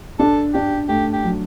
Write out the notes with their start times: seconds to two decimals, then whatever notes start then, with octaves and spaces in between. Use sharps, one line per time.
0.19 D4 A4
0.54 D4 G4
0.89 A3 G4
1.13 G4
1.24 F#3